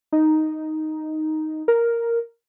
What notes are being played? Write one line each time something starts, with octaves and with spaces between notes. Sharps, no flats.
D#4
A#4